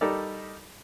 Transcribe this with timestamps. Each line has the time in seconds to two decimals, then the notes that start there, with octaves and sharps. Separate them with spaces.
0.01 G3 D#4 G4 A4 A#4 D5